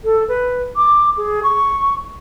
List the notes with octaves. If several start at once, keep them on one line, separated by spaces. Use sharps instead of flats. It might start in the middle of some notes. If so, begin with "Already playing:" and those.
A4
B4
D6
G#4
C#6